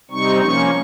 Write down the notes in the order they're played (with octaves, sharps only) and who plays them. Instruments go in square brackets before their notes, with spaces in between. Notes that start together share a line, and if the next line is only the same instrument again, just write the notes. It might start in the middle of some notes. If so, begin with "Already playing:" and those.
[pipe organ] C3 G3 C4 D#4 C#6
F3 A#3 C#4 C#6